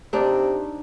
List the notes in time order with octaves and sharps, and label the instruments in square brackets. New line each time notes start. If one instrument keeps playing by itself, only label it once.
[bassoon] C3 [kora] D4 D#4 D5